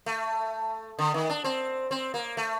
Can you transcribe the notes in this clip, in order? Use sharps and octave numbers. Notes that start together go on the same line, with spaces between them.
A3
D3
D#3
D4
C4
C4
A#3
A3